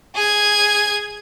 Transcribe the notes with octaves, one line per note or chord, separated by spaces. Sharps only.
G#4 G#6